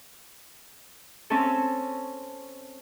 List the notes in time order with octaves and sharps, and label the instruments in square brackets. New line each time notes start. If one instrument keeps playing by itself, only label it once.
[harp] C4 C#4 A4